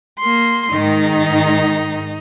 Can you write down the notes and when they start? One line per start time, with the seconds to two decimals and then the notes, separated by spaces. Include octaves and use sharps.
0.19 A#3 C6
0.72 G#2 D#3 D#4